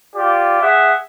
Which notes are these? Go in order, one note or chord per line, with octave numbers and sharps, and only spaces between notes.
F4 G4 D5
G#4 E5 F#5